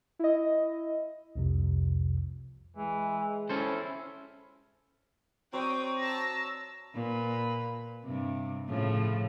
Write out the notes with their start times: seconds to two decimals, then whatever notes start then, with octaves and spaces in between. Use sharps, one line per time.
0.19 E4 D#5
1.36 C2 F2 C3
2.76 E3 G#3
3.50 C#4 E4 A4 C5
5.53 F#3 C4 C#5 D5 G5 A#5 D#6
5.98 A5 A#5 E6 A#6
6.94 A#2 B4
8.04 G2 C3
8.69 A2 C#3 F3